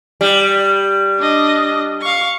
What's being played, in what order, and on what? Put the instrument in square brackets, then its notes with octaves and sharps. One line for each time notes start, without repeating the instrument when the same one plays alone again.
[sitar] G3
[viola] D4 D#5
F5 C#6